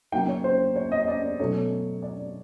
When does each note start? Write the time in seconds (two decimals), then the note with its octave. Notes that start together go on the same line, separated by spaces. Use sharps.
0.12 C#3 F#3 A#3 D#4 G5
0.28 C#5
0.44 C5
0.76 C#5
0.92 D#5
1.08 D5
1.39 B2 F#3 A3 C#4 C#5
2.02 D5